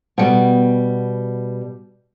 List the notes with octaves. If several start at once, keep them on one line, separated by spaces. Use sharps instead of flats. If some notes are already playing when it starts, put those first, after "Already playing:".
B2 G3